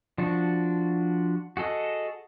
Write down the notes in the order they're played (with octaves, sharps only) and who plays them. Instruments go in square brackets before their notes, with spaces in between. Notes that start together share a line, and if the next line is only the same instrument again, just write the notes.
[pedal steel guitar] F3 D4 F#4
F#4 G#4 A4 D#5